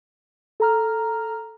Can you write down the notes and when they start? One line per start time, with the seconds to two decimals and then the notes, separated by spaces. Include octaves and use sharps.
0.60 A4 A#5 F6